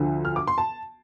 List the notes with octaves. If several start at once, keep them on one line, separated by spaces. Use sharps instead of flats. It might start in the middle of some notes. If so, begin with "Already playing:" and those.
Already playing: D2 D3 F3
F6
D6
C6
A5